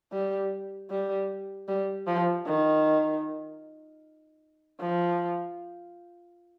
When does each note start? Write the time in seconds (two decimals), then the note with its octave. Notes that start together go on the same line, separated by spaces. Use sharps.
0.12 G3
0.90 G3
1.68 G3
2.07 F3
2.46 D#3
4.80 F3